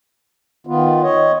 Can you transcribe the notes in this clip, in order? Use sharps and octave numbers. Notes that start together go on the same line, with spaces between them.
D#3 B3 F4
C#5 D#5